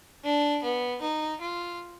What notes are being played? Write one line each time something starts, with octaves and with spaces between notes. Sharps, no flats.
D4
B3
D#4
F4